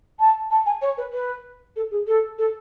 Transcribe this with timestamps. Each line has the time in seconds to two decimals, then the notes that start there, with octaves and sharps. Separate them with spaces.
0.19 A5
0.50 A5
0.66 G#5
0.82 C#5
0.97 B4
1.13 B4
1.76 A4
1.91 G#4
2.07 A4
2.38 A4